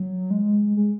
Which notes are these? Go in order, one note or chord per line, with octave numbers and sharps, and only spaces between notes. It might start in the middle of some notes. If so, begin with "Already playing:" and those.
Already playing: F#3
G#3
G#3